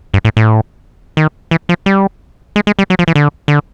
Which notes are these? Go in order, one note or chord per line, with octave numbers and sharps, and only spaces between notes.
G2
A2
A2
D#3
E3
F3
G3
G#3
G#3
G3
F#3
F3
E3
D3
D3